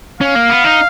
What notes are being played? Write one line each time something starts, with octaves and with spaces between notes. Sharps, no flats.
C#4 F5
A#3
B3
D#4